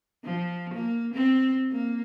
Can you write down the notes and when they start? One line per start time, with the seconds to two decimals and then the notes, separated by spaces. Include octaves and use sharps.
0.24 F3
0.74 A#3
1.14 C4
1.71 A#3